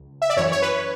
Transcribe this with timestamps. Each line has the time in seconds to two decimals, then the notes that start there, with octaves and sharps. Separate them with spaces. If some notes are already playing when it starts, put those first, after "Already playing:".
Already playing: C#2
0.22 E5
0.30 D5
0.37 F#2 E3 C#5
0.52 C#5
0.62 B4